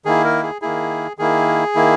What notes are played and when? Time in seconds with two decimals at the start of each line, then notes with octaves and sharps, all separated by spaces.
0.05 D#3 A#3 E4 G#4
0.24 A#4
0.43 G#4
0.62 D#3 A#3 E4 G#4
1.18 D#3 A#3 E4 G#4
1.75 D#3 A#3 E4